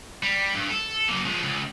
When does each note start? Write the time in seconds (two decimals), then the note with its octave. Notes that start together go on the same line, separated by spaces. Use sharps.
0.23 G3
0.55 G2
0.70 A4
1.08 F#2 A#3
1.25 F3 G#3
1.43 C#2